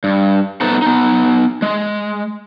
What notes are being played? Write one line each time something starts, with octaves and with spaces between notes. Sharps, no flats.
G2
A3 B3 D#4 A4 B4 C5
B3 D#4
G#3